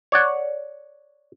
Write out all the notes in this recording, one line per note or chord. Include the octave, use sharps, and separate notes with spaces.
C#5 D5 F#5